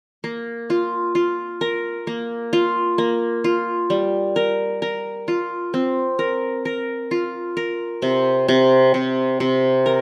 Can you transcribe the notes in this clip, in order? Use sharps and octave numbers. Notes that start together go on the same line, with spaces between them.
A#3
F4
F4
A#4
A#3
F4
A#3
F4
G3
A#4
A#4
F4
C4
A#4
A#4
F4
A#4
C3
C3
C3
C3
A#4